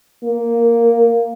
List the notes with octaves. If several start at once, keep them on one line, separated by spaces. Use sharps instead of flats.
A#3